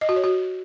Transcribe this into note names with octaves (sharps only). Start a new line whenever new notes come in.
D#5
F#4
C#5
F#4